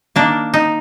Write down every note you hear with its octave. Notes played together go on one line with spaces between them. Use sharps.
D#3 A#3 D4
D#4